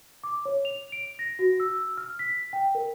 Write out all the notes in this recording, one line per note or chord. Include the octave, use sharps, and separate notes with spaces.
D6
C#5
F7
D7
A#6
F#4
E6
F6
B6
G5
A#4